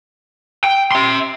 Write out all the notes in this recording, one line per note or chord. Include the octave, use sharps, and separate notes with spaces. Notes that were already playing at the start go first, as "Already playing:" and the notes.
G5
E5 C6